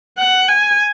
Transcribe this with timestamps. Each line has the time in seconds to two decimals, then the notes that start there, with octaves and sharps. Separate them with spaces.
0.18 F#5
0.49 G#5